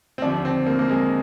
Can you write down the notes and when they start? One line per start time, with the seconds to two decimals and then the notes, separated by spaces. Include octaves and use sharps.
0.18 C4
0.22 D#2 D3 F3 D4
0.45 C4
0.67 A#3
0.79 A#3
0.90 G#3